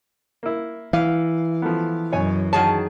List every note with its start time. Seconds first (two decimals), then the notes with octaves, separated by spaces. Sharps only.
0.43 A#3 E4
0.93 E3 F5
1.62 F3 A3 B3
2.12 F#2 B2 C#5 G#5
2.53 D#3 F#4 G#4 C#5 A5